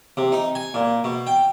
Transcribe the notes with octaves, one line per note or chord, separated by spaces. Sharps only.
C3
D#4
G#5
A#2
B2
G5